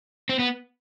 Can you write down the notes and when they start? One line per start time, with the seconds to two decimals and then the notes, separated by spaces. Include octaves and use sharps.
0.29 C4
0.39 B3